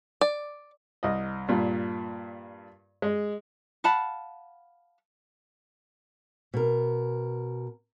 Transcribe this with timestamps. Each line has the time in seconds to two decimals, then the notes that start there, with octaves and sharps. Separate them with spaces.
0.21 D5
1.03 C2 D#5
1.48 G2 A#2
3.02 G#3
3.84 F5 F#5 A5 B5
6.54 B2 A#4